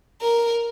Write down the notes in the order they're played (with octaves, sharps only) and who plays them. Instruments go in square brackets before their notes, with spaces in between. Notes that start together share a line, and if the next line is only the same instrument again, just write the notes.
[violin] A#4